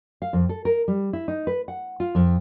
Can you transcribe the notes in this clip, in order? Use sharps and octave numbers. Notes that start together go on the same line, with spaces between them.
F5
F2
A4
A#4
G3
E4
D#4
B4
F#5
F4
F2